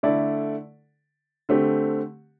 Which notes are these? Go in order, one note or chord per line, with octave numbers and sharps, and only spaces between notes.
D3 A3 E4 A4 D5
D3 A3 C4 G4